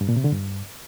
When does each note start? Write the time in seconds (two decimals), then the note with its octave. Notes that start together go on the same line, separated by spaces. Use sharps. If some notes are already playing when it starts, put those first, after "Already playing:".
0.01 G2
0.09 A#2
0.16 C3
0.24 D3
0.32 G2